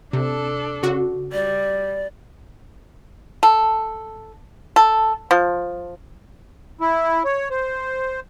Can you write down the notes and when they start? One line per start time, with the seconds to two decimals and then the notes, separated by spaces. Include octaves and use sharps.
0.13 C3 D4 A4
0.83 C#3 F#4
1.33 G3 D5
3.43 A4
4.76 A4
5.31 F3
6.81 E4
7.25 C#5
7.50 C5